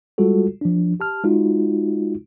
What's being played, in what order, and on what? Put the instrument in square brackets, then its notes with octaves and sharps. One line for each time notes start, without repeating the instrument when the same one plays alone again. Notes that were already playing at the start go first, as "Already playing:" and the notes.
[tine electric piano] G3 G#3 F4 F#4 A4
F3 D4
G4 A5 F6
G#3 D#4 F4 F#4